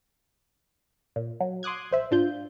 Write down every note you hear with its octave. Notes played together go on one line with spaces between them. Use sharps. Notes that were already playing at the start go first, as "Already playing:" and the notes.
A#2
F#3
C6 D6 D#6 F#6 G#6
A#1 C5 E5
G#2 D4 F4 G6